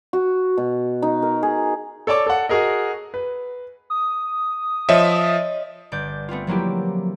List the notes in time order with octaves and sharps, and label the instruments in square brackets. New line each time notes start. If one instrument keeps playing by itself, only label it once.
[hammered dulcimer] F#4
B2
D#4
A#4
G#4
[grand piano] A4 C#5 D5 A5 D6
A4 F#5
F#4 G#4 A#4 D#5
B4
[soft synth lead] D#6
[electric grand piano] F3 E5 [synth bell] C#5 D#5
[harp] G1 D5 G6
A3 B3 C4 F4
F3 F#3 A#3 E4 G4